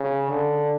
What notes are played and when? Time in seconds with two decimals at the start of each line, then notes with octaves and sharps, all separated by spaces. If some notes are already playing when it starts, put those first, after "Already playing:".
Already playing: C#3
0.30 D3